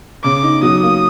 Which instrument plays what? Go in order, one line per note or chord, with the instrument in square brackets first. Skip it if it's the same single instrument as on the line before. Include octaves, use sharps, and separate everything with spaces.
[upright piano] C#3 [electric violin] D6
[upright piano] D#4
[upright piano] F#3 [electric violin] D#6
[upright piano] A#3